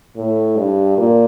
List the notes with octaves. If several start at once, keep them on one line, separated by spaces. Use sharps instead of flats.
A2
G2
A#2